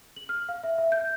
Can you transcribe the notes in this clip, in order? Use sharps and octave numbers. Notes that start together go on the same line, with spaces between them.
F#7
F6
F5
E5
E5
G6